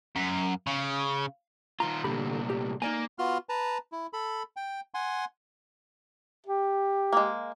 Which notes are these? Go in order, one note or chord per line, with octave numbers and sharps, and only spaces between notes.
F#2
C#3
D#3 F4 A#5 C6
C2 A#2 D3 G4 B5
G4
A#3 D#4 D5 G#5
B3 F4 F#4 C6 F6
B4 A5 A#5
E4
A4 B5
G5
F#5 G#5 C6
G4
G#3 A#3